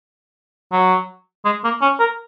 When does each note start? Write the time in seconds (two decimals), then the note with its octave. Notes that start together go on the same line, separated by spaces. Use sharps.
0.72 F#3
1.45 G#3
1.64 A#3
1.81 C#4
1.99 A#4